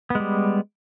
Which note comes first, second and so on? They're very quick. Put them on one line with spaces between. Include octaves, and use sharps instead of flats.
B3 G#3 G3